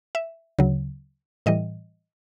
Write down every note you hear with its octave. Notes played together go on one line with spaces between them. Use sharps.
E5
D2 C#3 F#3
A2 E3 G3 D#5